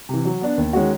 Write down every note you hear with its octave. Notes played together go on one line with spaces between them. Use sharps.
C3 E3
F#3
B3 D4
D#2
D#3 G#3 C#4 F#4